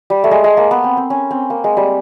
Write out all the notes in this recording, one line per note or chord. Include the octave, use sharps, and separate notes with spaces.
G3
A3
G#3
G#3
A#3
B3
C4
C4
C#4
C4
A#3
G#3
G3